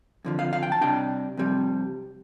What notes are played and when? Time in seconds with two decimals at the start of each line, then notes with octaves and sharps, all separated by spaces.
0.25 F2 D3 F3
0.39 F5
0.53 F5
0.63 G5
0.72 A5
0.81 C3 G3 D4 G5
1.37 F2 C3 G3